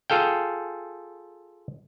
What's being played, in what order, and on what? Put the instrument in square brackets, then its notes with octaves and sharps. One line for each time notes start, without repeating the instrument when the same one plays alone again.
[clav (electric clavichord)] F4 G#4 A4 F5 G5